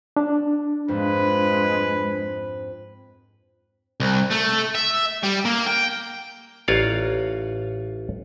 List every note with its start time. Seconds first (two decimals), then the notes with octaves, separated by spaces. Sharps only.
0.17 D4
0.88 F2 G#2 G#3 B4
4.00 C2
4.30 A3
4.75 E5
5.23 G3
5.45 A#3
5.67 G5
6.68 A1 F4 C#5 D5 F5 A#5